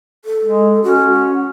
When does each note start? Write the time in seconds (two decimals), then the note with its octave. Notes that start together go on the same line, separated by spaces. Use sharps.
0.25 A4
0.45 G#3
0.84 C#4 F#4
1.12 F#5